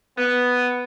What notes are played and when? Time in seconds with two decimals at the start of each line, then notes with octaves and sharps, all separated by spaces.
0.18 B3